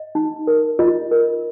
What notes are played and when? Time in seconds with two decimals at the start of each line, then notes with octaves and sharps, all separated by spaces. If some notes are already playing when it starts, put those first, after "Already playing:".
Already playing: D#5
0.15 D#4
0.47 A#4
0.79 F4 D#5
1.11 A#4